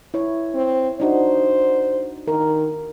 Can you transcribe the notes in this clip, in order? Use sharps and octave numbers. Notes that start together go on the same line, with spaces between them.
E4 C#5
C4
D4 D#4 F#4 C5
D#3 A#4